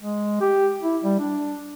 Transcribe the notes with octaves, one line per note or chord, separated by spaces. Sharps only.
G#3
G4
E4
G3
D4